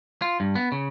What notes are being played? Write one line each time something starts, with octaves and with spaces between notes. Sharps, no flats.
F4
G2
B3
C#3